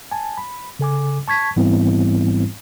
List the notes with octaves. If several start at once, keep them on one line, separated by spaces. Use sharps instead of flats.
G#5 A5
B5
C#3 A4 G#5 D6
A5 C#6 G#6 B6
G#2 E3 G3 B3 C4 E4